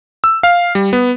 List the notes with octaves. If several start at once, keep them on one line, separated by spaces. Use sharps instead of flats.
E6
F5
G3
B3